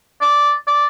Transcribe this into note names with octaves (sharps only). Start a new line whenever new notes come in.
D5
D5